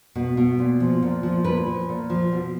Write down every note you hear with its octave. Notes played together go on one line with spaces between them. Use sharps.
B2
B2
A#2
F3
A#2
F3
A#2 B4
F3
A#2
F3
B2